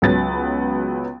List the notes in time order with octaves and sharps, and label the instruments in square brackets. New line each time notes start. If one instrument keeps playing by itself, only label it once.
[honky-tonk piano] C#2 F#3 B3 A6